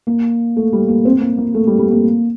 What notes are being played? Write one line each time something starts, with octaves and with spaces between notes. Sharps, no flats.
A#3
A3
G3
A#3
C4
A#3
A#3
A3
G3
G3
A#3